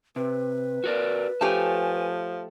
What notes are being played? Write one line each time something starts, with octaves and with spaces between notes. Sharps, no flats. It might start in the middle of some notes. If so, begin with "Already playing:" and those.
C3 B4
F#4 A#4 D5
F3 A3 G4 C#5 G#5 A5